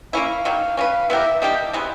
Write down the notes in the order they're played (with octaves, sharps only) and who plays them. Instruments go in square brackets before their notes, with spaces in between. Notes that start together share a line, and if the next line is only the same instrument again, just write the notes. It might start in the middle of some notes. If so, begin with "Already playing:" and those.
[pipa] A#3 C#4 E4 [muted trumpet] F5
[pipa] D#3 F#3 A#3
[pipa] C#4 F#4 B4 [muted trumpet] F5
[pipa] B3 E4 G4 A#4 [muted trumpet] E5
[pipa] G3 A#3 D4 G4 [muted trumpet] D#5
[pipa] C3 E3 G#3 B3